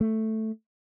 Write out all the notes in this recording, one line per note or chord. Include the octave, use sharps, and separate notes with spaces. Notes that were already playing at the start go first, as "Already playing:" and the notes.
A3